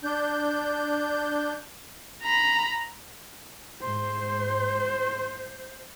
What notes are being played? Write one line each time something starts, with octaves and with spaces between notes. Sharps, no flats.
D4 G6
A#5 B5
G#2 C5 C6